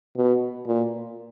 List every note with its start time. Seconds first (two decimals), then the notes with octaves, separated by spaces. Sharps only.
0.17 B2
0.67 A#2